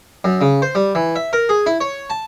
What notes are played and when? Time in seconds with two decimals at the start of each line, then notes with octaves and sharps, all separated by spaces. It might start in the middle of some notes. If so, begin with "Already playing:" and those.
0.24 F#2
0.41 C#3
0.62 C5
0.75 G3
0.95 E3
1.16 E5
1.33 A#4
1.49 G#4
1.66 E4
1.81 C#5
2.10 A5